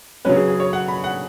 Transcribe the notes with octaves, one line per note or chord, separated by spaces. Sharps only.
C#3 F#3 C#4 B4
G#4
G#4
C#5
F#5
B5
F#5